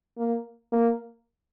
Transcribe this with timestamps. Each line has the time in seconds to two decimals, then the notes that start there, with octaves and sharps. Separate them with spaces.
0.18 A#3
0.72 A#3